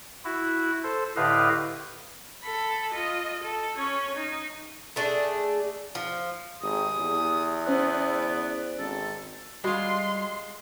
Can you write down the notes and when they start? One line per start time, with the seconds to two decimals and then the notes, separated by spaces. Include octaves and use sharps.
0.25 E4 F#4
0.84 A4 C5
1.16 A2 D3 G4 B4 D#5 F5
2.42 A4 B5
2.92 F4 D#5
3.43 A4
3.76 C#4 C#5
4.15 D#4
4.96 A3 D4 G#4
5.95 F3
6.62 G#1 G4 G#4 D#6
6.99 E2
7.66 B3 C#4 C5 D5 F#6
8.79 G#1 A4
9.64 G3 G#3 F4 F#4 D#5 B5 C6